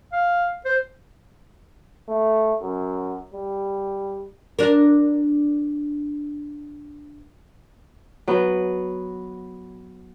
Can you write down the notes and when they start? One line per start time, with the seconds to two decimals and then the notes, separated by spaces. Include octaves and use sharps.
0.13 F5
0.65 C5
2.08 A3
2.61 F#2
3.34 G3
4.59 D4 A#4
8.28 F#3 B3